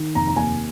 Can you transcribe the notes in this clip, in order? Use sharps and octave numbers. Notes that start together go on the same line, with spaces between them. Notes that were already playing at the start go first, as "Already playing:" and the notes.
Already playing: D#3
F1 A#5
A#5
D#2 G#5